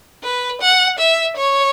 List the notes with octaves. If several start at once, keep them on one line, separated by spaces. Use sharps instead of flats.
B4
F#5
E5
C#5